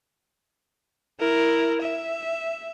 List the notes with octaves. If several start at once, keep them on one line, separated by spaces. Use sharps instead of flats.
E4 A#4
E5